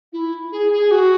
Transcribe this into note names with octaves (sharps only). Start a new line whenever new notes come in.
E4
G#4
G#4
F#4